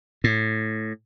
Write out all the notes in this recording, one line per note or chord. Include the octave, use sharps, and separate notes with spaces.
A2